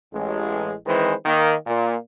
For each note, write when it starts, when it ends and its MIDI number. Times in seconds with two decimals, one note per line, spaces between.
0.13 0.74 33
0.13 0.74 56
0.86 1.14 51
0.86 1.14 52
0.86 1.14 56
0.86 1.14 60
0.86 1.14 71
0.86 1.14 72
1.25 1.55 51
1.25 1.55 58
1.67 1.97 46